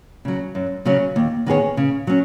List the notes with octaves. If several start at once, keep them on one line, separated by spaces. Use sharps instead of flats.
C#3 F#3
F#2
C#3 F#3 C#4
D#2
D#3 B3 G#4 C#5
C#3
F#3 C#4